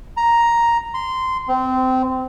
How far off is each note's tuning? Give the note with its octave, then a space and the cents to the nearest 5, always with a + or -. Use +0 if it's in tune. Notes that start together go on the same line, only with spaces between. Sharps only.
A#5 +5
C6 -15
C4 -20